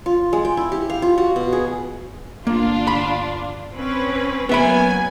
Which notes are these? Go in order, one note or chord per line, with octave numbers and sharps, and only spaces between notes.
F4
G#3
G5
E4
G4
F5
F4
F#4
B2
G#4
G1 A#3 D4 F4
B5
C4 C#4 B4
F#3 A#3 B3 E5 G#5 B5